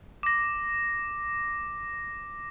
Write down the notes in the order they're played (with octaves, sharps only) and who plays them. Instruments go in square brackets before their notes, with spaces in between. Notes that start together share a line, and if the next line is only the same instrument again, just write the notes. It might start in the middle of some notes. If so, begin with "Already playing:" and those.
[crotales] D6 A#6